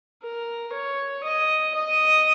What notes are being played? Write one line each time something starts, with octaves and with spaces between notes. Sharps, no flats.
A#4
C#5
D#5
D#5